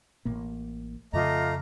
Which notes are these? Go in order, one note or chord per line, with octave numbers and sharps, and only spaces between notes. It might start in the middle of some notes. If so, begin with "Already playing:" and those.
A1 A2 A#3
F2 C#3 A3 F4 D#5 A#5 D6